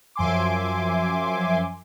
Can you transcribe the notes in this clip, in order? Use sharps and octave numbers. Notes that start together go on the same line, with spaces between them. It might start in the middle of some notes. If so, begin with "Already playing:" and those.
F#2 F3 E5 G#5 C6 D6